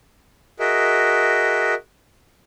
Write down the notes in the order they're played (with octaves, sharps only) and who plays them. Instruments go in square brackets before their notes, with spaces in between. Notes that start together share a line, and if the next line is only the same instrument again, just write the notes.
[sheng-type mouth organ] F#4 G#4 A#4 D#5 E5